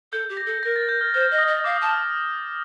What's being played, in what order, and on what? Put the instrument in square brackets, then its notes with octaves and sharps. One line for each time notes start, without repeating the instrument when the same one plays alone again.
[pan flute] A4 [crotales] G6
[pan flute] G4
[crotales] A#6
[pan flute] A4
[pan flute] A#4 [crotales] A#6
[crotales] A6
G6
F6
[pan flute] C5 [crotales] F6
[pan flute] D#5
[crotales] D#6
[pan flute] D#5
[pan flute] F5 [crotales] D6
[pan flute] A5 [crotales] D#6
[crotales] F6